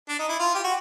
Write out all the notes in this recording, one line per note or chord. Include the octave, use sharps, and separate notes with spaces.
D4
D#4
E4
F4
G4
F#4